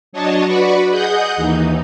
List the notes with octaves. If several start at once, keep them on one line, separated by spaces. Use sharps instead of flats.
F#3 D4 C#5 D#5 A5
F#4 B4 D5 B5 C#6
G#4 D#5 F#5 D#6 G6
D#2 E3 D#4